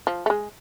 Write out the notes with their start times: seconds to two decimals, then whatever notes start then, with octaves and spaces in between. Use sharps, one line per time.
0.07 F3
0.26 A3
0.30 G#3